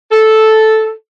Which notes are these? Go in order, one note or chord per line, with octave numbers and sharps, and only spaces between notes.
A4